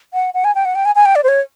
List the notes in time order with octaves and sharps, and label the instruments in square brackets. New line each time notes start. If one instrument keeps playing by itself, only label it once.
[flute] F#5
F#5
G#5
G5
F#5
G5
G#5
G#5
G5
D5
C5
C#5